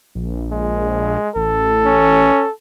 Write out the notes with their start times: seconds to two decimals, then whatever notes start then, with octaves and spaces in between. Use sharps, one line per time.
0.15 A#1
0.52 G#3
1.36 A1 A4
1.86 C#4